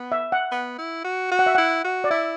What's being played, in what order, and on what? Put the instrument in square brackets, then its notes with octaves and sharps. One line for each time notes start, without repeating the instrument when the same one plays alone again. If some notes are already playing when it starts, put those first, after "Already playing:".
Already playing: [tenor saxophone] B3
[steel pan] E5
F#5
[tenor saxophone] B3
E4
F#4
F#4
[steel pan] F#5
E5
[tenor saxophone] E4 [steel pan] F#5
[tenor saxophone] F#4
[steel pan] D5
[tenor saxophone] E4 [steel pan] E5